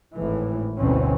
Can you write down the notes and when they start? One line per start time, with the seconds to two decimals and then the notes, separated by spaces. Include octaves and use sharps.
0.14 G#1 A2 E3
0.77 G1 D2 B2 E3 C4 C#4